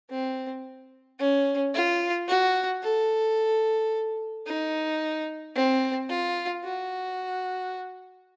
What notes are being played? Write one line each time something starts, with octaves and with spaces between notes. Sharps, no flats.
C4
C#4
F4
F#4
A4
D#4
C4
F4
F#4